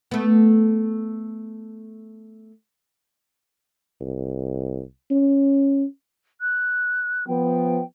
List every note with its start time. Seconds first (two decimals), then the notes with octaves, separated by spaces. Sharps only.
0.11 A3 B3
4.01 C2
5.11 C#4
6.41 F#6
7.27 F3 B3 G5